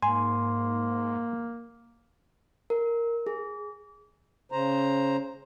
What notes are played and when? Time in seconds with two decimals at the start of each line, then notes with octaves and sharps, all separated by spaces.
0.02 G#2 A#3 G#5 C6
2.70 A#4
3.27 G#4
4.52 C#3 C5 A#5